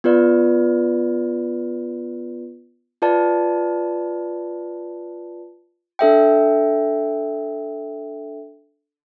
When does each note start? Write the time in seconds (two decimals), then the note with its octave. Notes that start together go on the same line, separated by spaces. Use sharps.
0.04 B3 F4 B4 D5
3.02 F4 B4 D5 A5
5.99 D4 A4 E5 G5